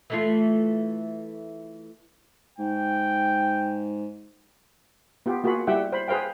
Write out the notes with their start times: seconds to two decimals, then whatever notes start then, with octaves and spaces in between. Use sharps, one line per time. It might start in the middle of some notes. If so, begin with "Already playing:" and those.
0.10 E3 A3 F4
2.59 G#2 G5
5.26 B3 F4 G4
5.44 A#3 F4 F#4 G#4 B5
5.67 G3 E4 G4 E5 F#5 G5
5.92 C5 B5
6.08 G#4 B4 C5 F5 G5